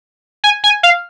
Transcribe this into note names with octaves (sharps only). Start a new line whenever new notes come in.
G#5
G#5
F5